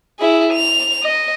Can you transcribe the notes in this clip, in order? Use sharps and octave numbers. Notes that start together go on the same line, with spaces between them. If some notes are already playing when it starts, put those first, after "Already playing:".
E4 G#4
F7
D#5